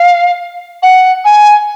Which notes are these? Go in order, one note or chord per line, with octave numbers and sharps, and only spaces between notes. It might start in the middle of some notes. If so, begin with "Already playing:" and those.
Already playing: F5
F#5
G#5